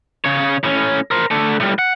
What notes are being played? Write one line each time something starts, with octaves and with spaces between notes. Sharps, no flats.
C#3 C#5
A2 C#4
A#4 C5
D3 A3
A2 G3
F#5